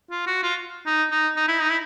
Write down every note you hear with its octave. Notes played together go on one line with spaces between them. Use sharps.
F4
F#4
F4
D#4
D#4
D#4
E4
D#4
E4